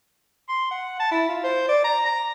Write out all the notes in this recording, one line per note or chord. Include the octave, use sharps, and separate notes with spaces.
C6
F#5
A5
E4
F4
C5
D5
A#5
A#5